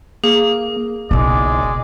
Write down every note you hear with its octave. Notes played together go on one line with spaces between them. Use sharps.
A#3 G#4
F#1 B1 G#3 E4 D5